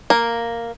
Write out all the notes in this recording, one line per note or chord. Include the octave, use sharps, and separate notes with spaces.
A#3